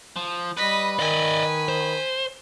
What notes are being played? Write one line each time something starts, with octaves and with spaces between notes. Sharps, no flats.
F3
G3 B4 D#5 B6
D#3 D5 D#5 G#5 B6
C5